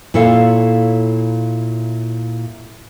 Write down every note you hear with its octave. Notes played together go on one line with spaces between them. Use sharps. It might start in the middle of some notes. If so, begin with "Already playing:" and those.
A#2 E4 A4 C#5 F5